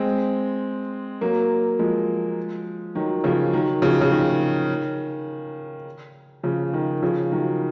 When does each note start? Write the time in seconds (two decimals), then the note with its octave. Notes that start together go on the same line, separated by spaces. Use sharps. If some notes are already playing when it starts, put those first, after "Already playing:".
Already playing: G#3 C4
1.21 F#3 A#3
1.79 F3 G#3
2.95 D#3 F#3
3.24 C#3 F3
3.53 D#3 F#3
3.82 C#3 F3
4.01 C#3
4.12 D#3
6.43 C#3 F3
6.73 D#3
7.02 C#3 F3
7.31 D#3 F#3